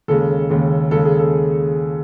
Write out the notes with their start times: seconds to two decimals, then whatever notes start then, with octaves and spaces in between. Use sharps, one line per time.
0.08 D#2 C#3 G#3 A4
0.50 D#2 C#3 G#3
0.91 D#2 C#3 G#3 A4
1.05 G#4
1.19 A4